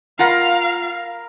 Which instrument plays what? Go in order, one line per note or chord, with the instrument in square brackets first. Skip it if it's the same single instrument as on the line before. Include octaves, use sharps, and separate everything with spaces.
[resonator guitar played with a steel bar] F4 F#5 [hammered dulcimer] A#4 A#5 B5 [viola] F5